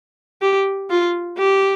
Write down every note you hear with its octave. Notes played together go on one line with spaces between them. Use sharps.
G4
F4
G4